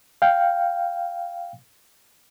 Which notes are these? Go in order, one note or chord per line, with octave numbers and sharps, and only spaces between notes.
F5 G5